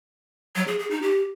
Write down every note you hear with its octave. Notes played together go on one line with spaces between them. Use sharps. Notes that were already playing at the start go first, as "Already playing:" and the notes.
F#3
G#4
G#4
D#4
G4